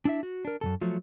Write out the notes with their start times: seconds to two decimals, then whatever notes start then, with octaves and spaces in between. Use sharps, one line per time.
0.05 D4 E4 E5
0.23 F#4
0.45 D4 A#4
0.61 F#2 B2 A4
0.81 F3 F#3 A3